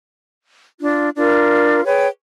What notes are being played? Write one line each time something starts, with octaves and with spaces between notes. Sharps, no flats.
D4 F4
D4 F4 A#4
G#4 B4 C#5 G5